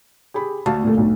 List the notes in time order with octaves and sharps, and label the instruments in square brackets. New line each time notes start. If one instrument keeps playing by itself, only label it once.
[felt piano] G4 G#4 B5
[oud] D2 [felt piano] F#4 F5 A5
[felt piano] A#2 A3
B1